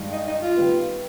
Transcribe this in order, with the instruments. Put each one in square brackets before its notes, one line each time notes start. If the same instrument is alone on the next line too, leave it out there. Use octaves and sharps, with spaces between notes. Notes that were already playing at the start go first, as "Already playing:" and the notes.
Already playing: [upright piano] G2 D#3 G#3
[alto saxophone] D#4
D#4
F4
[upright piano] D#3 G3 B3